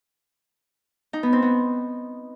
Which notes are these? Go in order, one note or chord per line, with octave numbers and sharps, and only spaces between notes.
D#4
B3
C4
B3